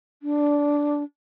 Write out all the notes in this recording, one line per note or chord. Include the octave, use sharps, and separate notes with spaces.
D4